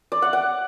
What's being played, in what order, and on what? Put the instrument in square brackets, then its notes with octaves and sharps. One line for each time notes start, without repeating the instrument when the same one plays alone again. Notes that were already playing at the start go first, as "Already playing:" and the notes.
[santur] D5
F#5
F#5